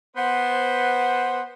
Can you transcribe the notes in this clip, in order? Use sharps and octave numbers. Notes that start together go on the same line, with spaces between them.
B3 C5